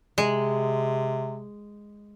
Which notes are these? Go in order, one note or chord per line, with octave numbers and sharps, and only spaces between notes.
C3 G#3